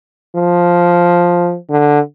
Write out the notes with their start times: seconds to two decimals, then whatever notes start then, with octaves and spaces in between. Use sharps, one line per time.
0.35 F3
1.69 D3